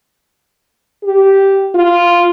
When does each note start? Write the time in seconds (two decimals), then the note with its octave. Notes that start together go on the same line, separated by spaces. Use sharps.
1.04 G4
1.75 F4